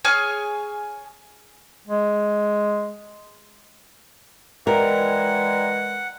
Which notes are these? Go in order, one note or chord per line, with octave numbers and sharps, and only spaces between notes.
G#4 C#5 G#5 F6
G#3
E3 G#3 A#4 D5 F#5 G5 A#5